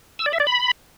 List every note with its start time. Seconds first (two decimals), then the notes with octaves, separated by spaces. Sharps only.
0.19 E6
0.26 D5
0.33 E5
0.40 D5
0.47 B5